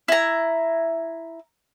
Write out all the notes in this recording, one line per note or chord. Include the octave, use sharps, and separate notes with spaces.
E4 A#5